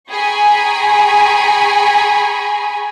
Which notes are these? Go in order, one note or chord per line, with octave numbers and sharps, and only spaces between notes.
G#4 G5 G#5 A#5 B5 C#6